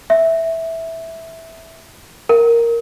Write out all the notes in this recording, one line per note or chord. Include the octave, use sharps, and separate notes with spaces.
E5
A#4